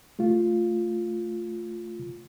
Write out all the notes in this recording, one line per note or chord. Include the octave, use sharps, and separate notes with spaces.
A3 F4